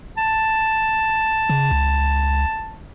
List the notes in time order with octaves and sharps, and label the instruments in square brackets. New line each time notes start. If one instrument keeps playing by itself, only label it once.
[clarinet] A5
[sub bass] C#3
C#2